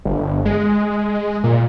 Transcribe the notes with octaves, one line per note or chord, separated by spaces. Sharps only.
G1
G#3
A#2